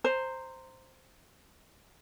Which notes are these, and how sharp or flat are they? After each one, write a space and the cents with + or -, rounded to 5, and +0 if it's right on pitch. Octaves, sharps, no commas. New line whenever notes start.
C5 +0 A#5 -10